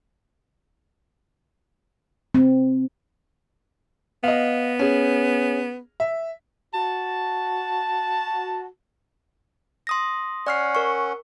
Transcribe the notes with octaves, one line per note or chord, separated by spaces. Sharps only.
C4
B3 D#5 F5
C#4 G#4
E5
F#4 A5
C6 D#6 A#6
C#4 D5 F#5 F6 C7
A#4 C#6